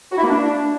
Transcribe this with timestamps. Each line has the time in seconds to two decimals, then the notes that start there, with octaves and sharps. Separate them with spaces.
0.12 F#4
0.18 E4
0.24 A#3
0.29 D4